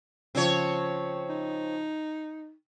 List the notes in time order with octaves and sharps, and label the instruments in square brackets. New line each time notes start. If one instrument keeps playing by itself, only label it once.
[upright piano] C#3 F3 [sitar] C4 C#5
[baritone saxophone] D#4